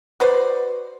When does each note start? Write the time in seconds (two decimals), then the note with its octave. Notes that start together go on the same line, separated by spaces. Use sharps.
0.20 F#4 B4 C5 D5